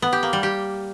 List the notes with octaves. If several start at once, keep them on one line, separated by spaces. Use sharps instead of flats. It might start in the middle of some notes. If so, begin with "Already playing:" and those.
B3
G4
A#3
G3
G4